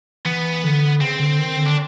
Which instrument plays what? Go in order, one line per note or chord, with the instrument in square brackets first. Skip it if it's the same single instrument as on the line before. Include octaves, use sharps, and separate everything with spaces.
[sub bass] E3 [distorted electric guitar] B3
[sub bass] D3
[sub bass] C#3 [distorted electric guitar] C4
[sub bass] D3
D#3
D3
[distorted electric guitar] D4